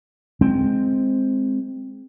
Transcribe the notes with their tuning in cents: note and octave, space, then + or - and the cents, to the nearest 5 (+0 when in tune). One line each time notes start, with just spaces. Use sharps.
G#3 +5 C4 +0